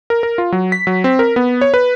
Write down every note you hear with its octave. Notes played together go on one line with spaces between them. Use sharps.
A#4
A#4
F4
F#3
B6
F#3
C4
A#4
B3
C#5
B4